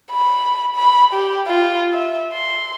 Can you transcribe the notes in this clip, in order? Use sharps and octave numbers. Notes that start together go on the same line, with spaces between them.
B5
B5
G4
F4
E5
C6